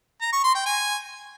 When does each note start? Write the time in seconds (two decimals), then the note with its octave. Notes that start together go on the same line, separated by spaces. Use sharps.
0.22 A#5
0.33 C#6
0.44 C6
0.55 G5
0.66 G#5